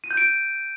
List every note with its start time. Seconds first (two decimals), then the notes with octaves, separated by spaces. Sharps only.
0.04 D#7
0.11 G6
0.17 D7